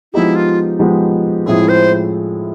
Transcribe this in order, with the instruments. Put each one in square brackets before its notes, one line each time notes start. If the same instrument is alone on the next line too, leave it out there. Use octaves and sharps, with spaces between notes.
[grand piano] F3 G#3 B3 D#4 G4 [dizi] E4
[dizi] F4
[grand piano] F3 G#3 B3 D#4 G4
[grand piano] A2 F3 G#3 C4 E4 [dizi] G#4
[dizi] C5